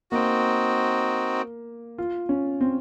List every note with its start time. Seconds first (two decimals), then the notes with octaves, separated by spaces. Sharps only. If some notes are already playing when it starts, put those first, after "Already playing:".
0.11 A#3 C4 D#4 F#4
1.98 F4
2.29 C#4
2.61 C4